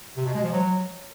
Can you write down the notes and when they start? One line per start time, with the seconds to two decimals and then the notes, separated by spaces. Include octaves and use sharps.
0.16 C3
0.25 B2
0.34 G#3
0.43 F3
0.52 F#3